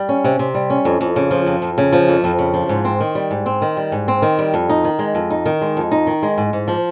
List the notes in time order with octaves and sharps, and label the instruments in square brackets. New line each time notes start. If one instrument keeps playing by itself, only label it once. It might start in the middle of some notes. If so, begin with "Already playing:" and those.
Already playing: [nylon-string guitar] G3
C#4
C3
C3
G3
C#4
F2
F2
C#3
F3
F2
F2
C#3
F3
F2
F2
C#3
F3
G#2
C4
D#3
G3
G#2
C4
D#3
G3
G#2
C4
D#3
G3
F2
D#4
D#3
G#3
F2
D#4
D#3
G#3
F2
D#4
D#3
G#3
G#2
G#2
F3